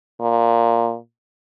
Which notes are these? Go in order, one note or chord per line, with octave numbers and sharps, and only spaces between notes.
A#2